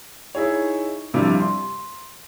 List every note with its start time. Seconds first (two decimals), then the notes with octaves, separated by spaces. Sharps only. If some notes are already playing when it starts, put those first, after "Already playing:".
0.35 D#4 E4 G#4 C#5
1.13 G2 C3 F3 G3 D4 E4
1.40 C6